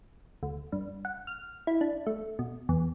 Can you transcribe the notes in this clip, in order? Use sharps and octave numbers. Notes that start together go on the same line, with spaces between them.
D2
G2
F#5
F6
E4
D4
A3
B2
E2